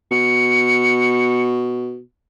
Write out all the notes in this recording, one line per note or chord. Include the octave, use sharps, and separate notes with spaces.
B2 C#7